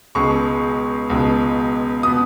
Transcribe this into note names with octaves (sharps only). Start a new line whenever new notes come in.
C#2 B2 G#3 C#6
C#2 B2 G#3
B2 B3 D#6